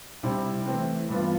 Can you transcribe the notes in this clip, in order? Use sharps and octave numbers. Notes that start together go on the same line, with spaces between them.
C3 G3 C4 E4
E3 A3 C4
G2 E3 B3 F4